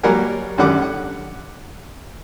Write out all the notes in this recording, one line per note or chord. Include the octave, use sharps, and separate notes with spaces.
F#3 G3 A#3 A#4 F#5 G#5
G#1 F#2 D3 G3 F#5 D6
F#5